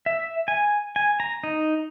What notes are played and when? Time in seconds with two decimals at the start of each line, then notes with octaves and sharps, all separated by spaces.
0.06 E5
0.48 G#5
0.96 G#5
1.20 A#5
1.44 D#4